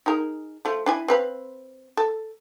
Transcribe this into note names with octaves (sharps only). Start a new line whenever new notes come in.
D#4 G#4 A#4
F3 A3 F4
D4 E4 G#5
C4 B4 F5
A4